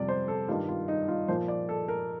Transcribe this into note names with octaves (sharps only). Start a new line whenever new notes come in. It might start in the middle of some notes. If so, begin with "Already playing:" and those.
Already playing: F2 C3 G3 D5
C5
A4
G2 D#3 G3 F4
F4
D#4
F4
A#2 F3 C5
D5
A4
A#4